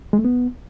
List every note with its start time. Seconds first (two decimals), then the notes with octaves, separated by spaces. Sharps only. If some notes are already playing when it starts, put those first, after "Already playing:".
0.13 G#3
0.19 A3
0.25 B3